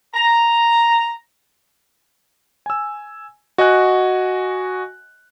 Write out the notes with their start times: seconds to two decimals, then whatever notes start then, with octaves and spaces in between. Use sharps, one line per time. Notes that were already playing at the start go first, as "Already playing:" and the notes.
0.14 A#5
2.66 G#5 E6
3.58 F#4 D#5 F#5 G#5 F#6